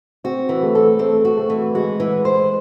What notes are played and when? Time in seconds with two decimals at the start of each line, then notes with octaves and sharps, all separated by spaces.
0.24 C4 F#4
0.49 E3
0.63 A3
0.75 A4
0.99 A3 C4
1.25 F#4
1.37 A3
1.50 E3
1.75 G#3 F#4
2.00 E3
2.25 C5